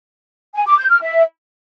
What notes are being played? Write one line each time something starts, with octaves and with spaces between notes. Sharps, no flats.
G#5
D6
G6
F6
E5